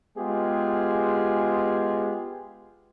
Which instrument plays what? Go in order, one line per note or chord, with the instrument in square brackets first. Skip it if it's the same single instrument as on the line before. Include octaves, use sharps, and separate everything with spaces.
[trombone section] G#3 B3 F4 G4 G#4